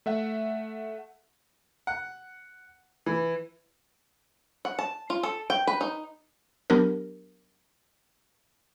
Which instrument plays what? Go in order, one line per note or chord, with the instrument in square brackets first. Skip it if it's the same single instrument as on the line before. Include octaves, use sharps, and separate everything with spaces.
[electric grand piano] A3 E5 F#5
[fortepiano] F#5
E3
[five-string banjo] F#5
A5
F4
A4
G5
B4
D#4
[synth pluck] F#3 B3 D4 G4 A#4